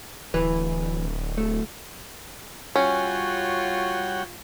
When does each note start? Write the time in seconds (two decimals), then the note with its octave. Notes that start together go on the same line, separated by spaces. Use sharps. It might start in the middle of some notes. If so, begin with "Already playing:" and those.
0.34 D1 E3 B4
1.38 A3
2.76 G3 C#4 F4 F#4 C#5 F#5 G5